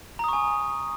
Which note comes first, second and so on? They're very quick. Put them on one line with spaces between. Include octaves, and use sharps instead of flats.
A#5 D#6 C#6 G#5